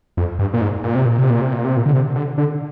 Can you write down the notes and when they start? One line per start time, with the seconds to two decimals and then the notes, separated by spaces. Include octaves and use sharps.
0.17 F2
0.39 G2
0.54 A#2
0.61 G#2
0.84 A#2
0.95 C3
1.06 A#2
1.18 C3
1.30 A#2
1.41 C3
1.53 A#2
1.64 C3
1.77 A#2
1.86 D3
1.93 C3
2.16 D3
2.38 D3